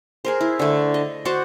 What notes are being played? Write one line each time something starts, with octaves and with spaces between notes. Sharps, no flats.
G#4 A#4 C5
E4
D3 A3
D#5
F#4 C5 D5 F#5